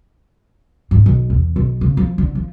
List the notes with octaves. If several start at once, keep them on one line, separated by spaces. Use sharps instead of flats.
G#2
B1
E2
B1
C#3
F3
D3
F3